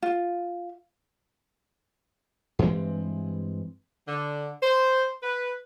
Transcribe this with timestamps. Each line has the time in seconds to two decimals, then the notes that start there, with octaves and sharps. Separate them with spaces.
0.02 F4
2.59 G2 E3 G#3 C4
4.08 D3
4.63 C5
5.23 B4